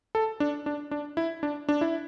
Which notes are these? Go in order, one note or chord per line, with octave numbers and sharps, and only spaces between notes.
A4
D4
D4
D4
E4
D4
D4
E4